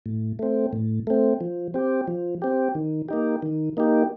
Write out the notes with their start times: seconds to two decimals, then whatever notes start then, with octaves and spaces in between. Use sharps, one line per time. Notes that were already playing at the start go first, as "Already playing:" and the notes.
0.06 A2
0.39 A3 C4
0.73 A2
1.07 A3 C4
1.41 F3
1.74 C4 G4
2.08 F3
2.42 C4 G4
2.75 D#3
3.08 A#3 D#4 G4
3.42 D#3
3.77 A#3 D#4 G4